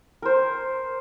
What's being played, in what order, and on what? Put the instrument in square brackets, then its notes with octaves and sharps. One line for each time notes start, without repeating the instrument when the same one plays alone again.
[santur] A#4 C5